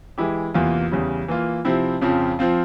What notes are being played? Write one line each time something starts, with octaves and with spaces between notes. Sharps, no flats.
E3 G#3 E4 G4
E2 C3 E3 A#3 F4
E2 C#3 G3
E3 A#3 F4
C3 F3 C4 E4
F2 C#3 F3 C4
F3 C4 F4